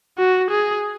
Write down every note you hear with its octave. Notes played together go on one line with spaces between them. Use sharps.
F#4
G#4